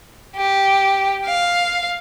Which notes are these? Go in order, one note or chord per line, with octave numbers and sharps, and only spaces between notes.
G4
F5